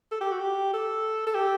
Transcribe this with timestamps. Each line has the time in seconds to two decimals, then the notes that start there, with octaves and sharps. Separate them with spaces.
0.11 A4
0.21 G4
0.31 F#4
0.40 G4
0.73 A4
1.27 A4
1.34 G4